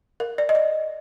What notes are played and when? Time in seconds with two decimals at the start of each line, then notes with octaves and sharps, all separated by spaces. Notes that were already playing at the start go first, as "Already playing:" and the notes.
0.20 A#4
0.38 D5
0.49 D#5
0.55 D5